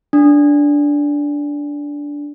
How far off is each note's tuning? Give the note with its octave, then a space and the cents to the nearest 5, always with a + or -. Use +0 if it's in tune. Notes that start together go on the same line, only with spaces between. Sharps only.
D4 -10